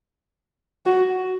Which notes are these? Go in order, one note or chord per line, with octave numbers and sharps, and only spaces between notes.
F#4